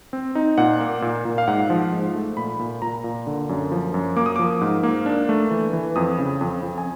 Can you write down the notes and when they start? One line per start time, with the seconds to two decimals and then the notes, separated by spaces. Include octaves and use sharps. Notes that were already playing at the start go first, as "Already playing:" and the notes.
0.13 C4
0.35 D#4
0.58 A#2 F#5
0.80 A#3
1.02 A#2
1.25 A#2
1.38 F5
1.47 G#2 F#5
1.70 F3
1.92 G#2
2.15 A3
2.37 A#2 B5
2.59 A#2
2.82 A#2 A#5
3.04 A#2
3.27 D3
3.49 F#2
3.71 F3
3.94 F#2
4.16 A#3 D6
4.26 D#6
4.36 F3 D6
4.61 G#2
4.83 A#3
5.06 D4
5.29 A3
5.51 E3
5.73 E3
5.96 F2 D#6
6.18 C#3
6.41 F2
6.63 F2
6.78 G#5